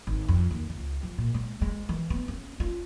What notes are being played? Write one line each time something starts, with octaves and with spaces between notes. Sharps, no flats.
G#1
F2
D#2
C#2
F3
A#2
G#3
G#3
E3
B3
C#4
F4